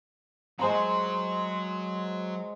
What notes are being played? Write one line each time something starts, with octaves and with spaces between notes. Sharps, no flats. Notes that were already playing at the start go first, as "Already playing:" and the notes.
F#3 G#3 F#4 C5 A#5